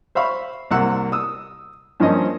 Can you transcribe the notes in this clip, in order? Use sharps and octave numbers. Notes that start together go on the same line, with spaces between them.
C5 E5 F5 B5 C#6
C2 C3 A#3 F#5 E6
D#6 E6
G2 F3 A#3 C4 C#4 D#5